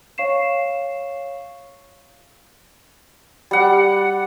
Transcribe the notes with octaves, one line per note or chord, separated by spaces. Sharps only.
C#5 F5 C#6 C7 E7
G3 F#5